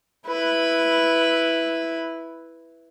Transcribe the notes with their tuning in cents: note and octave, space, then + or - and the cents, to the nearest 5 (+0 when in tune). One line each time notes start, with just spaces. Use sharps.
E4 +0 B4 +0